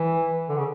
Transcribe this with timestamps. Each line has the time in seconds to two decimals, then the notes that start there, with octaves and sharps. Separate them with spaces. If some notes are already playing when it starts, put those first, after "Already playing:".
Already playing: E3
0.49 D3
0.57 C#3